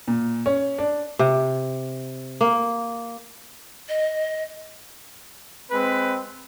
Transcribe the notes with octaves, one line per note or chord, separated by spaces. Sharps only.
A#2
C#4
D4
C3
A#3
D#5
G#3 C4 B4